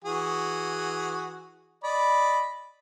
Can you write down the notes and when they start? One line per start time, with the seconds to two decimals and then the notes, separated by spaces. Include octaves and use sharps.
0.04 E3 F#4 G#4
1.84 D5 D#5 B5